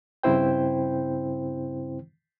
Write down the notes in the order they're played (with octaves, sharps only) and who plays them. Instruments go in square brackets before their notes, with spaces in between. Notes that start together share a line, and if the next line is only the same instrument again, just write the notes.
[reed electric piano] G2 C#3 C4 E4 C5 G5